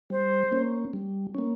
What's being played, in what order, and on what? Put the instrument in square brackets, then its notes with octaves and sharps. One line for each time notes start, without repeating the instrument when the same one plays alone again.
[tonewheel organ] G3 [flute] C5
[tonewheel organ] A#3 C#4
G3
A#3 C#4